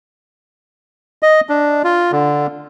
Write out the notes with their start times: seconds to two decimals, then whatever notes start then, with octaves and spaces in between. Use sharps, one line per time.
1.23 D#5
1.49 D4
1.84 F4
2.12 D3